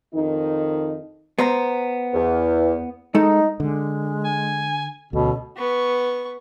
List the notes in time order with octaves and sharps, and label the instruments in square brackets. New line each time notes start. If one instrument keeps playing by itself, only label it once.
[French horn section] F2 D#3 D#4
[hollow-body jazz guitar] B3 C5 A#5
[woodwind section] E2
[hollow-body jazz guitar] G#3 A4 [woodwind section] D#4
[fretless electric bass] D3 [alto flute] G#3
[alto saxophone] G#5
[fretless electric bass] D2 [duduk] B2 [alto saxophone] C#4 [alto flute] A4
[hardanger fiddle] B3 C#6